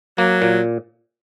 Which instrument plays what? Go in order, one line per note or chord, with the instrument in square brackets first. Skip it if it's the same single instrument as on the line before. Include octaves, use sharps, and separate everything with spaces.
[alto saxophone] F#3 [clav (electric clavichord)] A#3
[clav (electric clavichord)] A#2